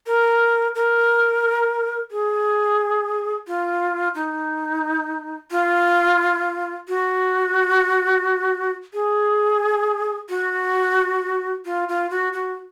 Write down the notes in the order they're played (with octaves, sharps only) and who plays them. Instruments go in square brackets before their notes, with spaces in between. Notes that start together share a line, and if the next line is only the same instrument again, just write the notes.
[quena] A#4
A#4
G#4
F4
D#4
F4
F#4
G#4
F#4
F4
F4
F#4
F#4